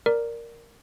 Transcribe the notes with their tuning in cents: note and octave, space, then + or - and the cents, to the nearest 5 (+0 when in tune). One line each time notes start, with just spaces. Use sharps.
A#4 +0 D5 +0